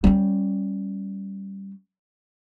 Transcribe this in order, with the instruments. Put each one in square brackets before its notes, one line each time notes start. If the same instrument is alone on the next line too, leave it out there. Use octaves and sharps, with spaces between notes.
[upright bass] G3 C#4